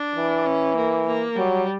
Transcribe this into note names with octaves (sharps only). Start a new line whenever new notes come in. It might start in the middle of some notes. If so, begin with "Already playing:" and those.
Already playing: D4
E3
C#4
A#3
A#3
F#3 G3